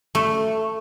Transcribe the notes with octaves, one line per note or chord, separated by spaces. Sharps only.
A3